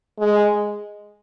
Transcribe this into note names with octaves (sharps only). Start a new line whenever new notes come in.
G#3